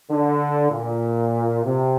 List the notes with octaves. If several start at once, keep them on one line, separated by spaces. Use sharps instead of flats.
D3
A#2
C3